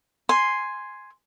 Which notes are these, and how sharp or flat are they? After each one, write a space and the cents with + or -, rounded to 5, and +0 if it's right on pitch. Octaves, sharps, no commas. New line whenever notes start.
G#5 +0 C6 +0